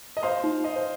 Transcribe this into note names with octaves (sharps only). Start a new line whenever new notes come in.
D#5
C5 F5 C6
D#4
D#5 C6
C5